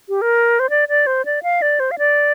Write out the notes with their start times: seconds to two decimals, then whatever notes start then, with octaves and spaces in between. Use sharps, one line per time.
0.09 G4
0.22 A#4
0.60 C5
0.70 D5
0.89 D5
1.07 C5
1.25 D5
1.43 F5
1.62 D5
1.80 C5
1.91 F5
1.99 D5